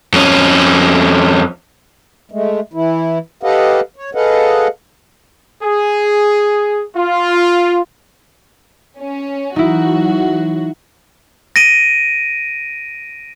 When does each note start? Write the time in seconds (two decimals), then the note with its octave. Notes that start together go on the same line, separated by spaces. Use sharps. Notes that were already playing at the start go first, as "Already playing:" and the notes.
0.13 F2 C#4
2.32 G#3 A3
2.73 E3 E4
3.43 G4 A4 B4 D#5 F5 F#5
3.96 C#5
4.15 G#4 A4 B4 D#5 F5 F#5
5.63 G#4
6.95 F4
8.98 C#4
9.56 E3 F#3 D#4 E4 F#4
11.56 A#6 D7 D#7